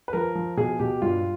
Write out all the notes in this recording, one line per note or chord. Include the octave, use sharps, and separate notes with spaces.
B4
F3 A#4
F3
B2 G#4
B2 G4
G2 F4